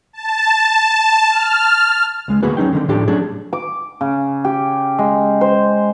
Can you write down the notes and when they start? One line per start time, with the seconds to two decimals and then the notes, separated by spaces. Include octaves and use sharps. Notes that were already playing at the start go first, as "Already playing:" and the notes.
0.13 A5
1.30 F6
2.28 C#2 G#3
2.43 D3 A#3 B3 F#4 G#4 B4
2.57 F#3 C#4 D#4 G5
2.73 D3 D#3 C4
2.88 A2 F3 D4 G4 A4
3.08 F#3 A3 C#4 D4 G#4
3.53 D6
4.01 C#3
4.44 G4
4.99 G#3
5.41 C5